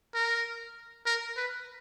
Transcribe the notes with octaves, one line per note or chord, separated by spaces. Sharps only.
A#4
A#4
B4